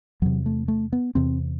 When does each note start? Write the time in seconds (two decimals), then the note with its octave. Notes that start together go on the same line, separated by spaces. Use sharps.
0.22 E2 C3 F#3
0.46 A3
0.68 A3
0.93 B3
1.15 E2 C3 C4